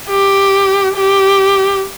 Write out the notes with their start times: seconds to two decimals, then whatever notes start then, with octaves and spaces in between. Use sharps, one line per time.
0.10 G4
0.97 G4